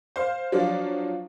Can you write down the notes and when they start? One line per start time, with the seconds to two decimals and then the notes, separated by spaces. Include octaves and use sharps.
0.16 C5 F5
0.52 F3 F#3 D4 F4